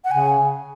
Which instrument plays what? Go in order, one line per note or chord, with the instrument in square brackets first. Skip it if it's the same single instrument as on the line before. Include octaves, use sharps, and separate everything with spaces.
[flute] F#5
[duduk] C#3 [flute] G#5